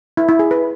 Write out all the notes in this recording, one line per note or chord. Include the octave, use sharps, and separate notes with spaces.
E4
E4
G#4
B4